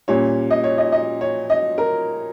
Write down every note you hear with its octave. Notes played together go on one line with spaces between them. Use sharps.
A#2 G3 C#4 C#5
D#5
C#5
D#5
D#5
C#5
D#5
A#4